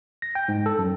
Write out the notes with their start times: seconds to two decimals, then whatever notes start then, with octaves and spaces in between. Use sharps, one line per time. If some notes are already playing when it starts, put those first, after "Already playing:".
0.22 A#6
0.35 G5
0.48 G#2
0.66 A4
0.79 F#2